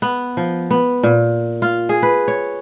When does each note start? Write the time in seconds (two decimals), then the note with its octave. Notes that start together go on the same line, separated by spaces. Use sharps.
0.02 B3
0.37 F3
0.71 B3
1.03 A#2
1.62 F4
1.89 G#4
2.03 B4
2.28 C#5